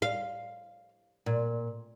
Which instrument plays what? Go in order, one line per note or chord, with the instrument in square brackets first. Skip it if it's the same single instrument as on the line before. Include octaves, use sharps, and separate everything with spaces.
[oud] F5
A#2